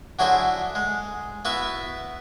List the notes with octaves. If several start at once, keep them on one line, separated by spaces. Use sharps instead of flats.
D3 F#3 E4 F#4 G#4 C5
G#3
B3 E4 F#4 B4 E5